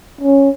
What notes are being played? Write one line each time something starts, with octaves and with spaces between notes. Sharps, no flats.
C#4